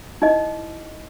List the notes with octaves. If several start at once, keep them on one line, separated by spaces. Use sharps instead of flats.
D#4 E4 D#5